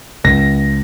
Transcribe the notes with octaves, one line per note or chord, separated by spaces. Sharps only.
C#2 A#6